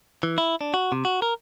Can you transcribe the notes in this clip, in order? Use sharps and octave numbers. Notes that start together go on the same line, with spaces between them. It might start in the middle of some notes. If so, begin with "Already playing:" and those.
E3
E4
D4
F#4
C3
F#4
A#4